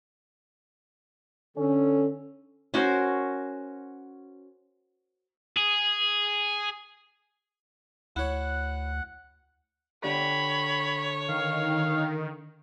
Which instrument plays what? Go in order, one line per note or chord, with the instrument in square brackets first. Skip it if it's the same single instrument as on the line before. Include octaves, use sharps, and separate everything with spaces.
[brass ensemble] D3 C#4 [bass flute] A4
[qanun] C#4 F#4 A#4 C5
[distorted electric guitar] G#4
[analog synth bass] D2 [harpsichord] E4 C#5 [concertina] F#5 F#6
[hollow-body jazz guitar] D3 G4 D5 [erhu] C#5 [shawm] B5
[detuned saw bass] D#3 [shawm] F5